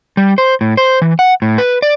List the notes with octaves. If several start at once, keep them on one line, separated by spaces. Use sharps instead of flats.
G3
C5
A2
C5
E3
F#5
A2
B4
D5